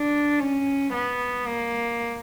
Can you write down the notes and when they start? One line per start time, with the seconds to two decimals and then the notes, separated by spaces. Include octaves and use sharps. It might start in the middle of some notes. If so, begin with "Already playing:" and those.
Already playing: D4
0.39 C#4
0.93 B3
1.47 A#3